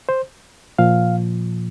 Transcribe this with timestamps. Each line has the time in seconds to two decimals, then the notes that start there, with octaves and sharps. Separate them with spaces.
0.09 C5
0.79 A#2 F3 F5